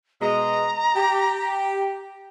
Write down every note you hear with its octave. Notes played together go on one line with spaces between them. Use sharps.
B2 G#3 D#5 A#5
G4